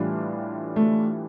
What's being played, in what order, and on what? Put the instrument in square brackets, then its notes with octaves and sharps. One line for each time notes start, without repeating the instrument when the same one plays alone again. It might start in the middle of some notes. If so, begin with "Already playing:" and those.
Already playing: [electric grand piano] A2 E3 G3 D4 F4
[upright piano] A3